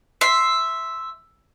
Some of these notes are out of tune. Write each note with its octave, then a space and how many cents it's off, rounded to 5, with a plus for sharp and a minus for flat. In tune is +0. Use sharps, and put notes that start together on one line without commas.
E5 +0 C6 +0